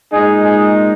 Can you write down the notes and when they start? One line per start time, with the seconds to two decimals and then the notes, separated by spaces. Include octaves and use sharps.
0.12 A#2 G#3 D#4 G#4
0.43 G#4